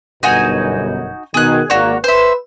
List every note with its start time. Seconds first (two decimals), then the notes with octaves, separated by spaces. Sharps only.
0.23 G1 F#2 B2 D#4 F#4 G#5
1.34 B2 D#3 G#4 F#6
1.70 G#1 A#3 F#4 C#5 D5
2.04 B4 C5 E5